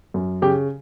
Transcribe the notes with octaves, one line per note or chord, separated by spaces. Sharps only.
F#2
C#3 G4